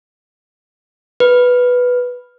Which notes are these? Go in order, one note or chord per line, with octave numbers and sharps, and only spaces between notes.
B4